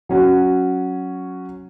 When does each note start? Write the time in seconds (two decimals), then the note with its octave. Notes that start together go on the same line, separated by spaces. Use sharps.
0.09 F#3 C#4 F#4